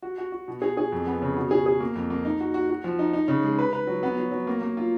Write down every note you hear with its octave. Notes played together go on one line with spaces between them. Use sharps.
F#4
F#4
F#4
B2
G#4
G#4
F2
B3
C#3
B2
G#4
G#4
A#3
F2
A#3
D#4
F#4
F#4
F#4
F3
D#4
D#4
C#3
G#3
B4
B4
F#3
B3
F#3
F#3
A#3
A#3
F4